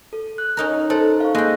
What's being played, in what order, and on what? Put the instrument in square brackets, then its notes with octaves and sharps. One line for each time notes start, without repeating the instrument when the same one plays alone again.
[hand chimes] A4
F#6
[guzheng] C#4 D#4 A#4
[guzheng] A4 [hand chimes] C5
[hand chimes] F5 C#6
[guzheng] G#3 G5 [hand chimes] A#3 F#6 A#6